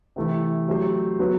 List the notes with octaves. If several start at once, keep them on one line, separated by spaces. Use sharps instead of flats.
C3 E3 A3 E4
F#3 A3 C4 G4 C5
F#3 B3 F#4 B4